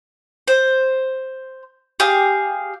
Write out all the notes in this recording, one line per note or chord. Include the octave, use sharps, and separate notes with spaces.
C5
G4 G#4 F5